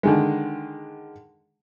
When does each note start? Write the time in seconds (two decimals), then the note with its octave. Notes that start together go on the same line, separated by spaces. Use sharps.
0.03 D3 D#3 G#3